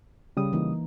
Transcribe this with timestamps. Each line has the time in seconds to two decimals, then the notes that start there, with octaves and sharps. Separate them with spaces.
0.37 C#3 G3 D#6
0.53 E3 A#3 D#4